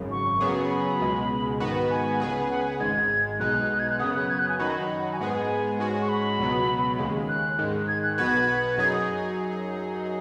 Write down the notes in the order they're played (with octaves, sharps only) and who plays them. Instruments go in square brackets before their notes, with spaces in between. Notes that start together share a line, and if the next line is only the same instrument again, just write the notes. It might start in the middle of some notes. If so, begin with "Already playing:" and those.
Already playing: [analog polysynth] G#1 F#2 C#3
[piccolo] C#6
[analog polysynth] F#2 C#3 F#3 B3 G#4
[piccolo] B5
[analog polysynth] C#2 B2 G#3
G#2 D#3 B3 F#4 B4
[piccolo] G#5
[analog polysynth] C#2 C#3 B3 G#4 B4
[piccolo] F#5
G#5
[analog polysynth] G#1 G#2 G#3 [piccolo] G#6
[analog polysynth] B1 B2 G#3 D#4 [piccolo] F#6
[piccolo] G#6
F#6
[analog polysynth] F#2 C#3 B3 [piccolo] D#6
[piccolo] F#6
G#6
F#6
G#5
[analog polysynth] F#2 D#3 F#3 D#4 F#4 [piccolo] B5
[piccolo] G#5
[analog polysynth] G#2 G#3 B3 G#4 [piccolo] F#5
[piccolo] G#5
[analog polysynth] G#2 G#3 C#4 F#4
[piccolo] C#6
B5
[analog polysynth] C#2 B2 F#3 B3
D#2 C#3 G#3
[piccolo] F#6
[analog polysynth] G#2 D#3 G#3
[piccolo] G#6
F#6
[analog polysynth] B1 B2 B3 F#4 B4 [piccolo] G#6
[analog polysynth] F#2 F#3 D#4 G#4 [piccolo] G#6
[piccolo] D#6